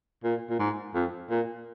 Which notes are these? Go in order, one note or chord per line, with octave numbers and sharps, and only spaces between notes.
A#2
A#2
G#2
F2
A#2